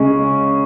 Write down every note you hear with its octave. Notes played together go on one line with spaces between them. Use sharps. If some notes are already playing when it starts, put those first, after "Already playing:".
Already playing: C#3 G#3 C#4